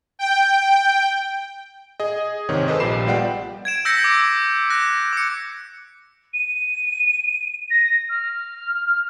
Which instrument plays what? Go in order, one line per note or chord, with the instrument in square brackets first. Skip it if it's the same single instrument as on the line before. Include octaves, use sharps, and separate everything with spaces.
[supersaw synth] G5
[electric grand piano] G#4 D#5
G#2 C3 D#3 C#5
G#4 A4 B4 C5 D#5
A#1 A#2 G4 B5 C7 E7
G3 B3 F4 D5 F#5 G5
[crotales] G#6 D7 E7
E6 G6 A#6 B6 C#7
D6
F#6 A#6
D6 C#7
[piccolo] D#7
A#6
F6